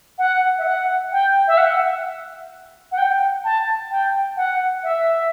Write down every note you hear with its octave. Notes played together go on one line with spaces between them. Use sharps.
F#5
E5
F#5
G5
E5
F#5
F#5
G5
A5
G5
F#5
E5